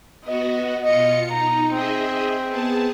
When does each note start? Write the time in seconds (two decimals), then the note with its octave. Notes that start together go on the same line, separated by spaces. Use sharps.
0.25 B3 F#4 D#5
0.84 B2 F4 D#5 C#7
1.31 D#4 A#5
1.73 C4 G#4 D#5 E5
2.47 B3 G#4 A5